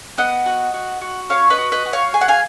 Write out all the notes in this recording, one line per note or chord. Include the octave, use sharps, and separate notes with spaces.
B3 D#5 F#5
F#4
F#4
F#4
C#4 C#5 F5
B4 D#5
F#4
B4 D#5
F#4
C#5 F5
G#4 G#5
F#5
F5 G#5